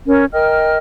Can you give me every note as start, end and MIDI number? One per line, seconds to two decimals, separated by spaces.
0.07 0.25 61
0.07 0.25 70
0.33 0.77 70
0.33 0.77 75
0.33 0.77 79
0.33 0.77 89